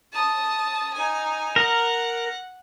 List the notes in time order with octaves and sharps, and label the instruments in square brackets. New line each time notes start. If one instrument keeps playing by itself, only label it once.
[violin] A5 D#6
D#4 G#5
[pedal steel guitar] A#4 [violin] F#5